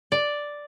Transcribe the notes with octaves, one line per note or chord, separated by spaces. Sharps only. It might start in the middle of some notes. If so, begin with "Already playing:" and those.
D5